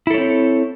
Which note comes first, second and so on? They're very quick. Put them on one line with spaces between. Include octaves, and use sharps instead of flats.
E4 A4 C#5 C4